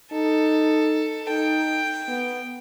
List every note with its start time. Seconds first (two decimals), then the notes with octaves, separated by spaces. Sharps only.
0.12 D#4 A4
1.29 D#4 G5
2.08 B3